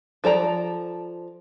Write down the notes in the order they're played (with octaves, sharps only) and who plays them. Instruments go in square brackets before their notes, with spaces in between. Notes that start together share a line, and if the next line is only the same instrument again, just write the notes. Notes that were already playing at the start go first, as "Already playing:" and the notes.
[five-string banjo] F3 A4 D5 A#5